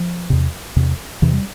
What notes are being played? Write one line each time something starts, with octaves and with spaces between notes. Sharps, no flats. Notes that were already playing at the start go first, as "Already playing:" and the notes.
Already playing: F3
E2 C3
E2 C3
E2 C3 E3
G3